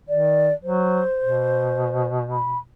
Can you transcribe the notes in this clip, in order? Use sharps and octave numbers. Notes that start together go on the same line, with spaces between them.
D#3 D5
F#3 C5
B2
B5